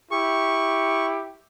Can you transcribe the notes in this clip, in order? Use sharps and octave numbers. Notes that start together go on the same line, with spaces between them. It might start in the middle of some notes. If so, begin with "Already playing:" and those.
E4 G4 C#6